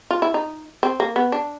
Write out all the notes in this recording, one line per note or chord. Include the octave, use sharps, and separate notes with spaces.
F4
E4
D#4
C4
A#3
B3
D4